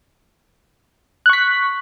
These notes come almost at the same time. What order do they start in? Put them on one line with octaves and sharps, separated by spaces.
F#6 C#6 B6